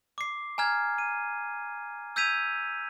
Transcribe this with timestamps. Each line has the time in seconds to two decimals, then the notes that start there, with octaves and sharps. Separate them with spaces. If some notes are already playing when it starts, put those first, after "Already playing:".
0.18 D6 C7
0.58 G#5 A#5 F6 G#6
0.98 D#7
2.16 E6 G6 G#6 B6 D#7 F7